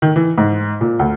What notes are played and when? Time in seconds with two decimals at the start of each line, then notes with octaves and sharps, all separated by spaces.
0.02 D#3
0.16 E3
0.38 G#2
0.81 A#2
0.99 D2